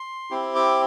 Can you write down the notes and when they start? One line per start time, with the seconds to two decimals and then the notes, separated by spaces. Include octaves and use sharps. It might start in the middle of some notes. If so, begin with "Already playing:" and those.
Already playing: C6
0.31 C4 E4 G4
0.56 D6